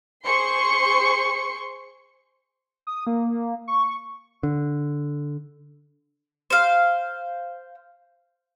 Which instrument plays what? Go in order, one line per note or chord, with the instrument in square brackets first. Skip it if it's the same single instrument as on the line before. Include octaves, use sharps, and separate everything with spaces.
[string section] G#4 C5 C6 C#6 C#7
[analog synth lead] D#6
A#3
C#6
[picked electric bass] D3
[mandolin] C5 F5